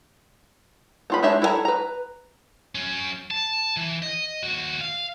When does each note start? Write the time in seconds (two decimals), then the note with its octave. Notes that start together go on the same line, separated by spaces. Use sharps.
1.10 B3 F4 B5
1.23 G#3 D4 G4 C#5 E5
1.42 E4 A4 C#5 G#5 A#5
1.65 B4 A#5
2.75 F#3 C#4
3.31 A5
3.77 E3
4.02 D#5
4.43 D#2 F#4
4.81 F5